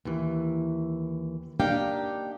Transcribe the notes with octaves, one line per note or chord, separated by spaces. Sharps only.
D#2 E3
A#3 D4 D#4 G4 F5 G5